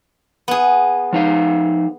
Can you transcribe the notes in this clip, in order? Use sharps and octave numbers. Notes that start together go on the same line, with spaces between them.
B3 G#4
F3 D#4 F5